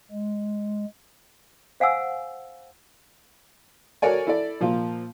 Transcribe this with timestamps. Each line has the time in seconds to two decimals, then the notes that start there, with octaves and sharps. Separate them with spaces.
0.11 G#3
1.80 C5 F5 F#5 G#5 E6
4.02 F#4 A4 A#4 C#5 D5 G#5
4.27 E4 A4 D5
4.60 A#2 F3 A#3 F4